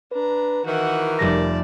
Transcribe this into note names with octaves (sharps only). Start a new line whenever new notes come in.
D4 B4 A#5
D#3 E3 F#4 A#4 F#5
F1 G3 D5 A5 A#6